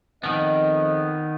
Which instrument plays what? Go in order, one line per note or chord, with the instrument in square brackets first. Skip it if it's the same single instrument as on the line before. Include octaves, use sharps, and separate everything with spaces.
[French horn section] F2 D#5 [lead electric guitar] D#3 B3